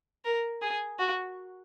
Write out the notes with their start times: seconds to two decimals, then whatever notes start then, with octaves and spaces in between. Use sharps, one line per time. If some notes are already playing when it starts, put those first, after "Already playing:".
0.25 A#4
0.62 G#4
0.99 F#4